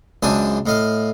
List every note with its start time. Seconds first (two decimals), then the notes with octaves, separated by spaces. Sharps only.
0.23 C#2 F#2 D4 C5 G#5 D#6
0.66 A2 D#5 F5